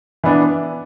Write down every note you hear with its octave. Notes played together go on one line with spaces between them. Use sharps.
E3 B3 D4